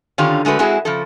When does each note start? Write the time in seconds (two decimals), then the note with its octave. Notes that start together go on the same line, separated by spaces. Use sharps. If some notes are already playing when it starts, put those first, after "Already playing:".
0.18 D3 D#3 C#4 F4 G4
0.45 D3 G#3 A3 F#4 B4
0.59 G#3 C4 E4 F#4 G#4
0.85 C#3 F3 A4